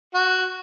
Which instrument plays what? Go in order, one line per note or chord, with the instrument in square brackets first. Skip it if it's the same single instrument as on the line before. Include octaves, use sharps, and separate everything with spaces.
[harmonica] F#4